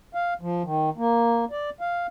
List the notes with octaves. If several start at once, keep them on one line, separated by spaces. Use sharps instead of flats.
F5
F3
D#3
A#3
D5
F5